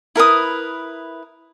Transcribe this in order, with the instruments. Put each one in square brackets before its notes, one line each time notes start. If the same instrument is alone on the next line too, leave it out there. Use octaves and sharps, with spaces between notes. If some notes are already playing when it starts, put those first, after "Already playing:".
[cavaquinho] E4 A#4 B4 D#6